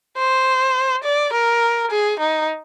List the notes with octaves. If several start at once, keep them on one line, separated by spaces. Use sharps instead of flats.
C5
D5
A#4
G#4
D#4